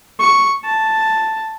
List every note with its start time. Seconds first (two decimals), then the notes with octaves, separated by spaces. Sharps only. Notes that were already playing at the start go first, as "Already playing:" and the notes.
0.20 C#6
0.65 A5